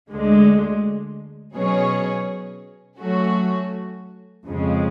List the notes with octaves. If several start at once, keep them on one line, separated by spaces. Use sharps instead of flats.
D2 D3 G#3
B2 F#3 C#4 G#4 C#5
F#3 A3 C#4 F#4
F2 C#3 G#3